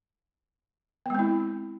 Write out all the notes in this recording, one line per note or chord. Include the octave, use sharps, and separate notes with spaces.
G#3 B3 C4 E4